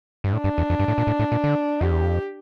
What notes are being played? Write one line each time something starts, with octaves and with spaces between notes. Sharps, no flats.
G2
A2 D4
G2
E2
F2
G2
A2
A#2
A2
A2
A#2
D3
F2 G4
E2
F2